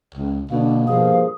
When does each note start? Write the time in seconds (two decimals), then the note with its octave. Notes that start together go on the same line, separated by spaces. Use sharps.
0.15 C#2
0.51 B2 D3 A#3 D4
0.88 G2 A#2 F3 G#4 F5